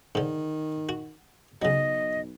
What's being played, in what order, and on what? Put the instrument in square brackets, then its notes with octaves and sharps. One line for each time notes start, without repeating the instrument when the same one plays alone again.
[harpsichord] G#2 D3 [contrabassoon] D#3
[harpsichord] F#4
[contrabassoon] B1 [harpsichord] C#3 F#3 [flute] D#5